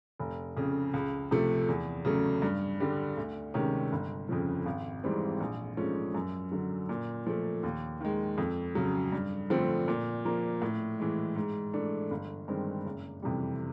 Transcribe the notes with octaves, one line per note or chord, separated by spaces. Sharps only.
F1
F2 C#3
C#2
C3 F3 A3
E2
C#3 F#3 A3
G2
D3 G3
D2
C3 D#3 G#3 C#4
G1
F2 C#3 F3
G#1
G#2 E3 G3 C4
A#1
G#2 F3 A3 C#4
F#2
D3 F#3
A#2
F3 A3
D#2
D#3 G#3
F2
C#3 F#3
G2
D3 F3 A3 C4
A#2
F3 A#3
A2
E3 G#3
G#2
E3 A3 D4
G1
G2 D#3 G#3 C4
F#1
F2 C3 E3 G3